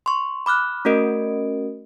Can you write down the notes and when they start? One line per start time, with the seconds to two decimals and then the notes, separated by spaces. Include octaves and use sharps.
0.06 C6 C#6
0.46 B5 D6 F6 F#6
0.85 A3 C#4 F#4 A#4 D#5 D7